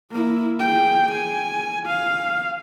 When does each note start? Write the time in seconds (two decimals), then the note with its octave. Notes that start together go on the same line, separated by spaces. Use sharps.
0.11 A#3 E4
0.60 G#4 G5
1.12 G#5
1.87 F5